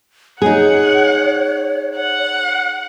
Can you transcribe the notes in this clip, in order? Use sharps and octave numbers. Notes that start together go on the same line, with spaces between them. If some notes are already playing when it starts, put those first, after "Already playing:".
D#4 G#4 C#5 F#5
F#5